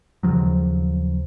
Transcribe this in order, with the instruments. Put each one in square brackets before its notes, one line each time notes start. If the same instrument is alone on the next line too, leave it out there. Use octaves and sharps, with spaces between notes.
[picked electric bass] D#2 C#3 F3 F#3